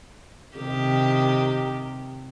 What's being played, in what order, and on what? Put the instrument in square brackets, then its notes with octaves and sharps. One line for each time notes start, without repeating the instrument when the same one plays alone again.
[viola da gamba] C3 D#3 G4